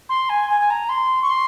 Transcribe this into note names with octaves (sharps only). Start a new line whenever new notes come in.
C6
G#5
G#5
G#5
A#5
C6
C#6
C6